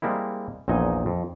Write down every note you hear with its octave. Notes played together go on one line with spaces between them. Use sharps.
G3 G#3 A#3 C4 E4
A#1 E2 A#2 D#4 D#5 G#5
F2